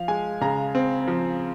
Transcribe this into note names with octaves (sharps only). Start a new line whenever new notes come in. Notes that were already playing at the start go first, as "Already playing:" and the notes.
Already playing: F3 F5
G#3 G#5
C#3 A#5
C4
F3